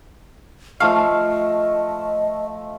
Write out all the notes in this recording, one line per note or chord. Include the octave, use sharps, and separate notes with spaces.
F3 A3 D#5 F5 C#6